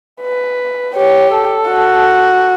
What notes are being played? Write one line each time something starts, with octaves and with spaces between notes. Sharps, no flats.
B4
G4 C#5
A4
F#4